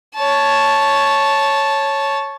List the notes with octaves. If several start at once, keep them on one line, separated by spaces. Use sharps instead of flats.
C#5 A5